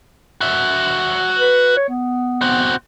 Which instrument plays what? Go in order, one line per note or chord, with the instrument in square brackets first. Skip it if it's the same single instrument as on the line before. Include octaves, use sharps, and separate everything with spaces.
[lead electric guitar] F#4 E5
[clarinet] B4
C#5
B3
[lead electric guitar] C4 F#4